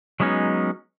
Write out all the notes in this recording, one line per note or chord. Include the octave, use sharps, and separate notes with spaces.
F#3 G#3 B3 C#4 D#4